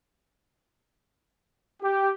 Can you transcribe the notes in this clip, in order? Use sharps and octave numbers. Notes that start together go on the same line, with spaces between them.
G4